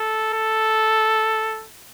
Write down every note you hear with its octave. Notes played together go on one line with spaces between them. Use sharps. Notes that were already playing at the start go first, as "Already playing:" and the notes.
Already playing: A4
A4